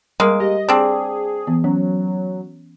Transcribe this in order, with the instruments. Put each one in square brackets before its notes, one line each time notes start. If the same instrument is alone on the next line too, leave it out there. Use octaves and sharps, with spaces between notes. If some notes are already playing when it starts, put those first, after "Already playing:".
[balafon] G3 A#4 [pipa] G#3 A#3
[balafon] G4 [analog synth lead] D#5
[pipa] C4 D4 [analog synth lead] G#4
[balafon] E3 B3
[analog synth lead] F#3 [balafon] C#4